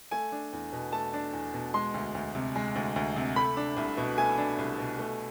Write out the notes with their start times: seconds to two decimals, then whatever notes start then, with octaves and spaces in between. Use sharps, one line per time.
0.11 A3 G#5
0.32 D4
0.53 E2
0.72 B2
0.93 A3 A5
1.14 D4
1.33 E2
1.54 B2
1.74 G#3 C6
1.94 D2
2.15 D2
2.35 C3
2.56 G#3
2.75 D2
2.96 D2
3.16 C3
3.36 A3 B5
3.57 D4
3.77 C2
3.97 B2
4.18 A3 G#5
4.38 D4
4.58 C2
4.78 B2
4.99 A3